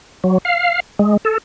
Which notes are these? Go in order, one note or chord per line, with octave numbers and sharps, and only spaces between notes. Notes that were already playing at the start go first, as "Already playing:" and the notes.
F#3
F5
G#3
A4